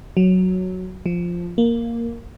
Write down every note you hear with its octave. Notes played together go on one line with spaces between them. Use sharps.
F#3
F3
A#3